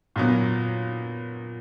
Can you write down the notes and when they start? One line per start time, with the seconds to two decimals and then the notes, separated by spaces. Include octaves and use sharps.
0.16 A#2 F#3 B3